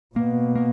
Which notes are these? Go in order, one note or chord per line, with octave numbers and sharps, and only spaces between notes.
B2 A#3
A#3